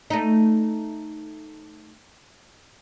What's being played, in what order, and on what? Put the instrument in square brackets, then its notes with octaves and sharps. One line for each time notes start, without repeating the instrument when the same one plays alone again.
[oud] A3 D#4